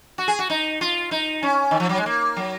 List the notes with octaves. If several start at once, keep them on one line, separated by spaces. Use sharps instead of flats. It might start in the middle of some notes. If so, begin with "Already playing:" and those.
F#4
G#4
F#4
D#4
F4
D#4
C#4
D#3
F3
F#3
G#3
A#3
F#3